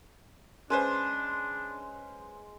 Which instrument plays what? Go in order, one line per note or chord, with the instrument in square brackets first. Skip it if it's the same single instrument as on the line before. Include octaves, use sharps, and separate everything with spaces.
[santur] G#3 [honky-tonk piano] C#4 B4 C5 [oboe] D4